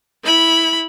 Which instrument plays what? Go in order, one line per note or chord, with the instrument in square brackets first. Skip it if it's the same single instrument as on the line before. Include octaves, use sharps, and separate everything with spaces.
[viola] E4 B5